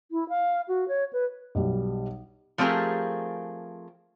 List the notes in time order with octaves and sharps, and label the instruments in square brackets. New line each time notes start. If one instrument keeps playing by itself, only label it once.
[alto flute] E4
F5
F#4
C#5
B4
[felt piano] B1 G3
[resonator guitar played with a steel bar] F3 A3 C4 G4 G#4 A#4